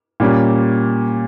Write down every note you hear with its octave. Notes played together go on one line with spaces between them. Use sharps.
A#2 G3 A#3 C#4